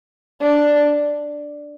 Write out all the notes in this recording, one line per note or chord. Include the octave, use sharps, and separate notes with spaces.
D4